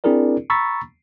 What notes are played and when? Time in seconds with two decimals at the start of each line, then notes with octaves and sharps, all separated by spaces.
0.04 C4 D4 E4 G#4 A#4 D5
0.50 A#5 B5 C#6 E6 A6 B6